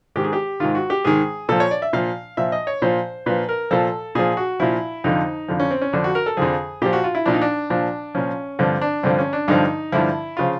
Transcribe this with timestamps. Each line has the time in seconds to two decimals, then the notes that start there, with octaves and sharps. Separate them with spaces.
0.16 G#2 D#3 G4
0.24 G#4
0.33 G4
0.60 G#2 D#3 F4
0.75 F#4
0.90 G4
1.05 G#2 D#3 G#4
1.49 A#2 F3 A4
1.60 C#5
1.71 D5
1.82 E5
1.93 A#2 F3 F5
2.37 A#2 F3 E5
2.52 D#5
2.67 C#5
2.82 A#2 F3 C5
3.26 A#2 F3 B4
3.49 A#4
3.71 A#2 F3 A4
4.15 A#2 F3 G#4
4.37 F#4
4.60 A#2 F3 E4
5.04 F2 D3 F3 D#4
5.48 F2 D3 F3
5.60 C#4
5.71 C4
5.81 C#4
5.93 F2 D3 F3 D4
6.04 F#4
6.15 A#4
6.26 A4
6.37 F2 D3 F3 G#4
6.82 A#2 F3 G4
6.93 F#4
7.04 F4
7.15 E4
7.26 A#2 F3 D4
7.34 D#4
7.41 D4
7.70 A#2 F3 D4
8.15 A#2 F3 C#4
8.59 G2 D3 F3 C4
8.81 D4
9.03 G2 D3 F3 C4
9.19 C#4
9.33 D4
9.48 G2 D3 F3 D#4
9.92 G2 D3 F3 E4
10.37 C#3 F3 F4